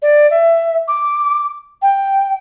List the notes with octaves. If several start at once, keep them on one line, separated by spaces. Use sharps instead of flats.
D5
E5
D6
G5